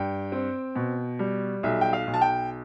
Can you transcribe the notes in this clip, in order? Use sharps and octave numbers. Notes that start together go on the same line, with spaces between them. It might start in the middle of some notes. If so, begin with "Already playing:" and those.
Already playing: G2 G5
C4
B2
G3
B1 E5
G5
F5
B1
A5
G5